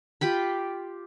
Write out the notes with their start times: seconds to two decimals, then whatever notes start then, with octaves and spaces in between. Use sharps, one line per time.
0.21 F4 G4 G5 B5